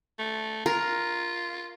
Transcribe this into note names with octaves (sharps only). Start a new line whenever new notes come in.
A3
F4 A#4